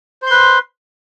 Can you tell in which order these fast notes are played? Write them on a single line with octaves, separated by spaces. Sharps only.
C5 C6 B4